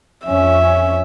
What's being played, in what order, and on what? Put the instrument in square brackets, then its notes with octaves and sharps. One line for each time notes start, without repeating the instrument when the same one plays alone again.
[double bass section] F2 C#4 [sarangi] E5